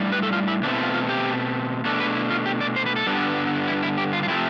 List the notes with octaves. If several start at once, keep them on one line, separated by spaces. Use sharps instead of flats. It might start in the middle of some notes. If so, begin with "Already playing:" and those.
Already playing: A2 G3 D4
B4
A4
F4
E4
B2 A3 C4 D4
E4
F4
F4
G4
B2 A3 D4 A4
B4
E4
F4
G4
D5
C5
B4
A4
G2 D3 G3 B3 D4
E4
E4
G4
F4
F4
C3 F3 A3 E4